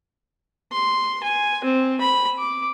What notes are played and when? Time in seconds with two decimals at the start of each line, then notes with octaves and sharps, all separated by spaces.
0.72 C6
1.24 G#5
1.64 C4
2.01 B5
2.39 D6